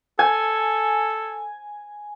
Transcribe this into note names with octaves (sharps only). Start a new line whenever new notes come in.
A4 G#5